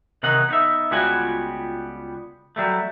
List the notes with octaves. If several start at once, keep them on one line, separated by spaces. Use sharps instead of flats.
C3 D#3 E3 D#4 F#5
B3 D#4 E5
C#2 G3 B3 F4 F#4 G#5
F#3 G3 A3